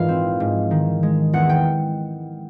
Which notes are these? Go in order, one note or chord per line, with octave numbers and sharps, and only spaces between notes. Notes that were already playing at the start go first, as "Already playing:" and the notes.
Already playing: A#1 G#2 E3 F5
C4
G#2
D#3
G#3
E2 F#5
G5